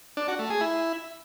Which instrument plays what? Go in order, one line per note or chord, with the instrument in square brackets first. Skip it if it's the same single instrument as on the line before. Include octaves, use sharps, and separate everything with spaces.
[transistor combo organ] D4
F#4
A3
G#4
E4